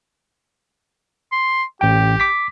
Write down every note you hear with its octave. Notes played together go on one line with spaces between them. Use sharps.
C6
A1 G4 G5
D6 B6